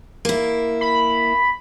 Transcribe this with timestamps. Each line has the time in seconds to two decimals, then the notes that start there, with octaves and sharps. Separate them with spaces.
0.25 A#3 E4
0.81 B5